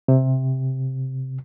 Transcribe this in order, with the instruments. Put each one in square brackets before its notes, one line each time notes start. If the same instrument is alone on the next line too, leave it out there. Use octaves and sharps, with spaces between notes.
[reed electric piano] C3